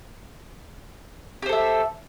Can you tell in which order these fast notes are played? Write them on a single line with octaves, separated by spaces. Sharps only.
G4 C5 A4 E5